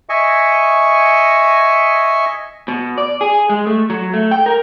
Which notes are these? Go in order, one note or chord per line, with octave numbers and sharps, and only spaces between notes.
D#5 E5 G#5 C#6
B2
D5
G#4
G#3
A3
F#3
A3
G5
A#4